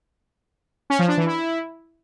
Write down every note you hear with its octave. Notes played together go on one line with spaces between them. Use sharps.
C#4
F3
D4
E3
E4